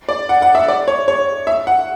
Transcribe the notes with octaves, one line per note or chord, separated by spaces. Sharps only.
D5
F#5
F#5
E5
D5
C#5
C#5
E5
F#5